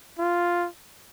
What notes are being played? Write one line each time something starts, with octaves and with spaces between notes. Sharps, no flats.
F4